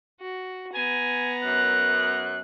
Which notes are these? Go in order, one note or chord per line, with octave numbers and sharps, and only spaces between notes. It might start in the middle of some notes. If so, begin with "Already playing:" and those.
F#4
B3 G#5 A#5
F#2 F#6